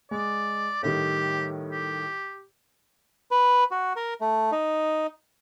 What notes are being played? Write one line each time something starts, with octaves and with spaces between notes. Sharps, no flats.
G#3 D5
A2 D#3 G3 G4
G4
B4
F#4
A#4
A3
D#4